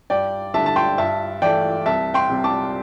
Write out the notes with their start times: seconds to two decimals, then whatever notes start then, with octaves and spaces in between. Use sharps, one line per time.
0.10 G2 D5 G5
0.54 D3 G3 E5 A5
0.66 A5
0.76 G5 C6
0.98 G2 E5 A5
1.42 E3 A3 D5 G5
1.86 C2 E5 A5
2.14 G5 C6
2.29 C3 G3
2.44 A5 D6